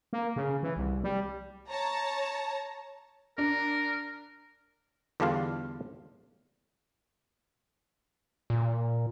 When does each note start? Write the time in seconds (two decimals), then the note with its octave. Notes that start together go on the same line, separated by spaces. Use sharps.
0.13 A#3
0.36 C#3
0.63 E3
0.77 C2
1.04 G3
1.69 C#5 A5 A#5
3.38 D4 A#4
5.20 E2 D3 G3 D4 F4 F5
8.50 A#2